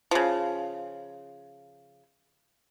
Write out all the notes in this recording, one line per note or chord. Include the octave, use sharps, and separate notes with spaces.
C#3 F3